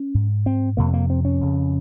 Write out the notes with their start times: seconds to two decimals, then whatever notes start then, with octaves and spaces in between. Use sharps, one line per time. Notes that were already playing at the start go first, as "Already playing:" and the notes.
Already playing: C#4
0.14 G#2
0.46 C4
0.77 F2 C3 A#3
0.94 A#3
1.10 C4
1.25 C#4
1.40 F2 C#3